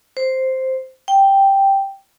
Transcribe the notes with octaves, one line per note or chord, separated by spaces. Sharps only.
C5
G5